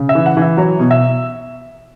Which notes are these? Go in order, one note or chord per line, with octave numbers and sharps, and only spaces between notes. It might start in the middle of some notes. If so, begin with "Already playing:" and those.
Already playing: C#3
E5
E3
F#5
E3
E5
F#3 C#5
B2
E5